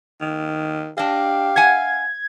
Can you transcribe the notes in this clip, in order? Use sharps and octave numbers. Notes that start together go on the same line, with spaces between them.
D#3
D4 G4 D#5 F5
E5 F#5 G#5 G#6